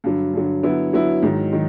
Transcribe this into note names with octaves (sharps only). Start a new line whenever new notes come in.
G2 D3 F#3
G2 D3 F#3
D3 F#3 B3 E4
D3 F#3 B3 E4
G#2 D#3 F#3
D#3 F#3